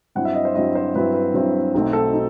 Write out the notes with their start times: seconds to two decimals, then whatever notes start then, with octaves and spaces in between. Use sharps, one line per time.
0.15 G2 F#3 C4 E4 F#5
0.25 E5
0.35 D#5
0.45 C5
0.55 G2 F#3 C4 E4 D#5
0.75 C5
0.95 G2 F#3 C4 E4 B4
1.14 B4
1.34 G2 F#3 C4 E4
1.75 B1 B2 A3 C4 D#4
1.93 A4
2.13 D#4